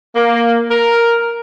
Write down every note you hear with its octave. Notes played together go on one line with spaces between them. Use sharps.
A#3
A#4